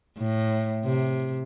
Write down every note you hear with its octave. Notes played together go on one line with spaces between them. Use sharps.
A2
C3